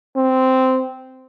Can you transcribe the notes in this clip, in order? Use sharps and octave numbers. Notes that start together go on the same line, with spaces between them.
C4